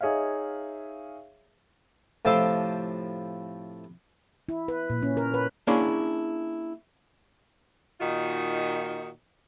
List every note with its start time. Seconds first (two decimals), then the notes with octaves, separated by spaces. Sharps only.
0.01 D#4 G#4 C#5 E5 F5
2.25 A2 C3 F3 A4 C6 D6
4.49 E4
4.68 B4
4.90 A#2
5.02 C#4
5.17 A#4
5.34 B4
5.67 A#3 C#4 D4 E4 G#4
8.00 A#2 D#3 D#4 F4 F#4